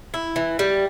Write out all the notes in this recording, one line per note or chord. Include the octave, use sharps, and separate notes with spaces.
E4
E3
G3